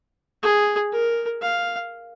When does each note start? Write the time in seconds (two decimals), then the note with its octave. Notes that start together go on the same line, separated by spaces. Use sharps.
0.42 G#4
0.92 A#4
1.42 F5